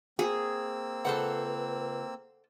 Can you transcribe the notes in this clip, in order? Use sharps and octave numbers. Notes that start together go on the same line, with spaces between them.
A#3 C4 G#4 E6
C#2 A4 B4 C5 F#5